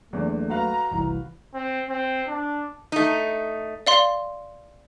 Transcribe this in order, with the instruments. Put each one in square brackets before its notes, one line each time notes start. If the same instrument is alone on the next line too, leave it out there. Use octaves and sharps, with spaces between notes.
[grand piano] E2 D4 [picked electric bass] F#3 A#3 [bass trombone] A3
[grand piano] F#4 B4 F5 [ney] A#5
[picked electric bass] F#1 C2 [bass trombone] E3
[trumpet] C4
C4
D4
[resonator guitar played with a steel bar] A3 D#4
[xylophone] D5 F5 C6